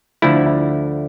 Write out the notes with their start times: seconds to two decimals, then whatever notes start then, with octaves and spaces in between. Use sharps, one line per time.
0.22 D2 D3 F3 A3 E4